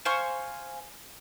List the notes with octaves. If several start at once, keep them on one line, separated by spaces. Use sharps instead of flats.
C5 F5 G#5 C#6